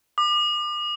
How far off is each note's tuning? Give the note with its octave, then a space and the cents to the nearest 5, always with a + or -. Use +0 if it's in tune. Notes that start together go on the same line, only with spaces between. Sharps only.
D6 +40